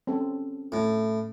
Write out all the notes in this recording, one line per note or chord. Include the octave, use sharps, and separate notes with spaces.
C4 C#4 A4
A2